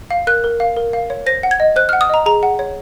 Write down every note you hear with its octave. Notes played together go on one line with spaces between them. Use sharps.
F5
A#4 F#6
A#4
F5
A#4
F5
C#5
C5 A#6
F#5
G#6
D#5
C5 F#6
F6
F#5
D#6
D#5 A#5
G#4 A#5
F#5
C#5